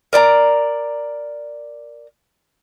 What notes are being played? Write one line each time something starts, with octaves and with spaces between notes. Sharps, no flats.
A#4 D5 A5 A#5